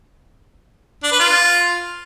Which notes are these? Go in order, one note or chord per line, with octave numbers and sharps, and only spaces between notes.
D4
B4
F4